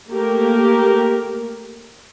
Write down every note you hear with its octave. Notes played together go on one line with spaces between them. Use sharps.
A3 A#3 G4 A#4